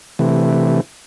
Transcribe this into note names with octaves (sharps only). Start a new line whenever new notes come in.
C3 E3 A3